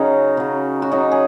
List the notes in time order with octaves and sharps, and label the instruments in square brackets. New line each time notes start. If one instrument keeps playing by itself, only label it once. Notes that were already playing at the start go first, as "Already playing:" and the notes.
Already playing: [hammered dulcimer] C#3 F#3 C#4 D#4 F#4 A#4
C#3 F#3
F#4
C#3 F#3 D#4
G#4